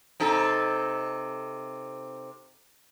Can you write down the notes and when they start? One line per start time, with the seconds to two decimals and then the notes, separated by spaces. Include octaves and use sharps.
0.20 C3 D#4 A4